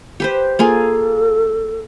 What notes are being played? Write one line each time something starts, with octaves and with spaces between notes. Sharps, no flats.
G4 B4 C5
A#3 F4 G#4 A4